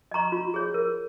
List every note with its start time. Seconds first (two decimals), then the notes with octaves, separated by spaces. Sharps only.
0.11 D#5 A#5 C#6
0.32 F4
0.54 G#4 C#5
0.74 A#4